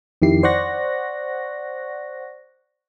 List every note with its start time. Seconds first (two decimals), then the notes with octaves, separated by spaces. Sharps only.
0.22 F2 D#3 E4 G4 C7
0.43 C5 D5 F#5 C#6 F#6 A#6